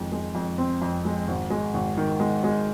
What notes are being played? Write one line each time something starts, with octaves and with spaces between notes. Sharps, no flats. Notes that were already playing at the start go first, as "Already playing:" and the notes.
Already playing: F2 D#3 G#3
G#3
F2
C4
F2
G#3
G#1
G#3
G#1
D#3
G#3
G#3